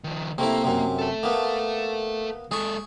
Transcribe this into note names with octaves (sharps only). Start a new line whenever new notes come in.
D#3 F3
C3 A3 A#3 E4
F#2 C3
A4 E5
A#3 B3
G#3 G#4 A4 C#6